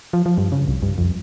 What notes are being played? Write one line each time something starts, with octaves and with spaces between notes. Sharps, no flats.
F3
F3
G2
C#3
C2
G2
F2